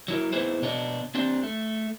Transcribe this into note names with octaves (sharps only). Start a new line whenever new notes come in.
F#3 E4 A#4
B3 D#4 E4 G#4 B4 C5
B2 B3 D4 C#5 D#5
C4 D4 G4
A3